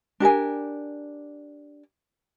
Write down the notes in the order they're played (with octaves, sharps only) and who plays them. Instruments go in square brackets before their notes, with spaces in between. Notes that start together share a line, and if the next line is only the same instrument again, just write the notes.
[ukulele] D4 G4 A#4 G#5